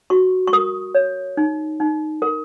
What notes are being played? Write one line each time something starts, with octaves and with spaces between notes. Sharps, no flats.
F#4 C#6
C#6
A#4 D#6
C#5
D#4
D#4
A#4